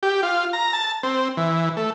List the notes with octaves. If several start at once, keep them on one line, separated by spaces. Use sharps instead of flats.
G4
F4
A#5
A5
C4
E3
A3